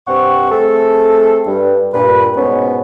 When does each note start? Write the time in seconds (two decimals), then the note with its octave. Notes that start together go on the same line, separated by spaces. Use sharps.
0.07 G2 C3 C4 F#5 C#6
0.51 A3 C4 G#4 A4
1.47 G2
1.94 G2 A#2 B4
2.36 G#2 B2 B3 C#4